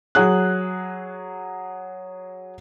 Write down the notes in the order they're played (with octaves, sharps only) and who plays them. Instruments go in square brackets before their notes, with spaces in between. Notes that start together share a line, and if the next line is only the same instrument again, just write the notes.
[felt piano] F#3 G#4 F#6